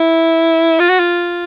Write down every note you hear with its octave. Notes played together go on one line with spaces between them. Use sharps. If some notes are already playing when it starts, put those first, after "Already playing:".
Already playing: E4
F4
F#4
F4